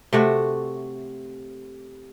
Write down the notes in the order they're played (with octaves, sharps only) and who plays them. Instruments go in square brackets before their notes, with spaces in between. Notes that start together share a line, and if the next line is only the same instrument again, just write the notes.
[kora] C3 A3 F#4